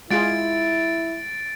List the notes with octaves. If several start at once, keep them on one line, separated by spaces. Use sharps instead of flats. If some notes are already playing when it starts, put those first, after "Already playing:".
G#3 E4 F4 G#4 A6 D7